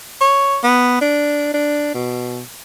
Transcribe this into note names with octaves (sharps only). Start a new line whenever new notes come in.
C#5
B3
D4
D4
B2